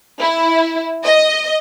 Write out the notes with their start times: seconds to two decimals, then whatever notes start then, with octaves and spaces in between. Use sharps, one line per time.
0.20 E4
1.04 D#5